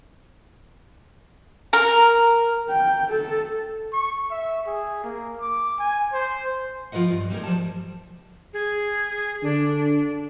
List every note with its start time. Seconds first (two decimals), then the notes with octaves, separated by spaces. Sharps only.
1.73 A#4 A#5
2.69 G5
3.10 A4
3.93 C#6
4.31 E5
4.67 G#4
5.04 A#3
5.40 D6
5.79 G#5
6.13 C5
6.92 F3 F4 B4 D#5 F#5
7.11 G2
7.30 G3 A3 B3 D#4 G#4 A#4
7.43 F3 G3 A5
8.53 G#4
9.43 D3 D4